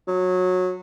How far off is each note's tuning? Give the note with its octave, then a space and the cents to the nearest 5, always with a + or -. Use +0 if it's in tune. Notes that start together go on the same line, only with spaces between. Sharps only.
F#3 -20